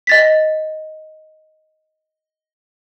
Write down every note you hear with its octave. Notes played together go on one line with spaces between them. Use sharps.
D#5 A6 B6